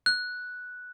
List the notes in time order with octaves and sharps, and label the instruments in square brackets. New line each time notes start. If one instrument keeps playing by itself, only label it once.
[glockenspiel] F#6